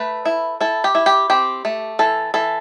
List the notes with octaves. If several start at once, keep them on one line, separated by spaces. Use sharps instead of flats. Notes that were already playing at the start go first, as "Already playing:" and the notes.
Already playing: A3 B4
E4
E4 A4
G4
E4
G4
C4 G4
A3
E3 A4
E3 A4